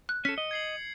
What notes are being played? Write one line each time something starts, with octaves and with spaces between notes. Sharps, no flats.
F#6
C#4 A4 B6 C#7
D#5
G#6 C7 F#7